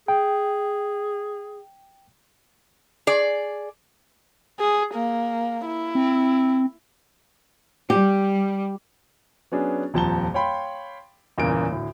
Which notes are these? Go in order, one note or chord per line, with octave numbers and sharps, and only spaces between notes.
G#4 G5
G#4 D5
G#4
A#3
E4
C4
G3 G4
F#3 B3 C#4 D4 G#4
D#1 F2 F3 A5 A#5 G7
C#5 F5 G5 B5 C6
G1 E2 A#2 C#3 A#4 D7
D2 A2